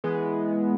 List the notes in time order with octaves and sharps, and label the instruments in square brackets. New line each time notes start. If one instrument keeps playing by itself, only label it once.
[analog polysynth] E3 G#3 B3